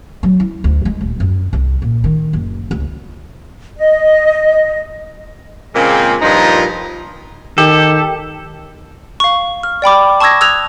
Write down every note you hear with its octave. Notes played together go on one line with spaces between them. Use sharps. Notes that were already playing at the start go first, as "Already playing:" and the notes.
F#3
E4
D2
G#3
D#1
F#2
C2
A#2
D#3
F#1
C#2
D#5
A#2 C#3 G#3 A#3 C4
G2 A#2 F3 D#4 F4 A#5
D#3 G4 A4
F5 C#6
F6
D5 G5 B5 D6
A5 C#6 D#6 E6 G#6 A#6
D#6 E6 F#6 G#6 F7